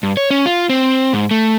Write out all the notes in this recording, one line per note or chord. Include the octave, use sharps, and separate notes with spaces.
G2
C#5
C#4
F4
C4
G#2
A3